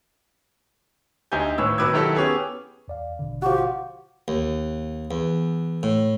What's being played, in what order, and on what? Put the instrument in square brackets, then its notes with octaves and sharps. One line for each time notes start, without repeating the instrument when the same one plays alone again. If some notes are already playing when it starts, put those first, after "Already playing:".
[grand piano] D2 D#4 G4 G#5 G6
G#1 A2 B4 C#5 E6
B2 D#3 B4 D6 E6 G#6
D#3 F#3 E4 G4 A4
B3 C#4 G4 G#4 B4
[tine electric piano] E2 D5 F5
G#1 B2 D3
[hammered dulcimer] F3 F#4 [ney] G4
[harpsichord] D#2
E2
A2